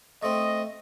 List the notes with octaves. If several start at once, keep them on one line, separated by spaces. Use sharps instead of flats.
A3 C4 D#5